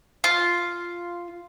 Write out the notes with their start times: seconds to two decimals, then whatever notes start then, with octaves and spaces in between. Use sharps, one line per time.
0.24 F4